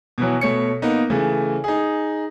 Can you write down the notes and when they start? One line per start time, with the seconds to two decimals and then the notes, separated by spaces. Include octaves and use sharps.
0.18 B2 E3 F#3
0.41 B2 A3 C#5 C#7
0.82 A#3 B3 D#4
1.10 C#3 E3 A3
1.64 D#4 G#4